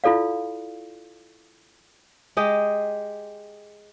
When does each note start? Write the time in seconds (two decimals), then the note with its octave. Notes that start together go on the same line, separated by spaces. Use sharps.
0.04 E4 F4 A4 D5 F5
2.37 G#3 G4 D#5